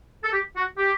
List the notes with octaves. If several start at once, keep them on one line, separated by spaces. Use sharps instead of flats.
A4
G4
F#4
G4